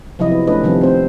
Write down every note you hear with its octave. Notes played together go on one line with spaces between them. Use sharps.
C3 F3 F#3 E4 D#5
B3
A3 C#4 D4 B4 D#5
C3 D#3 F3 G3 B3 C4
C4 C5